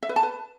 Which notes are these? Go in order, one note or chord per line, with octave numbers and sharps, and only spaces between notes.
E5
B4
A5
B4